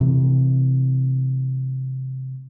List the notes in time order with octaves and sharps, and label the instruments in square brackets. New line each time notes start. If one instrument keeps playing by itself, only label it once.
[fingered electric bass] C3 E3 A3